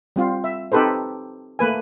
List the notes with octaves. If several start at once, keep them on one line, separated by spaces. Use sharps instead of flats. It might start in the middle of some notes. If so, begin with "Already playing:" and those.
G3 C4 F4
E5
C4 D#4 G4 A4 B4 C5
A3 A#3 B4 G#5